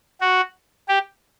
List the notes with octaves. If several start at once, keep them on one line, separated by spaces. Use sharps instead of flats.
F#4
G4